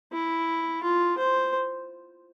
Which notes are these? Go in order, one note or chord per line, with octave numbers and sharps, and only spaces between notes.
E4
F4
C5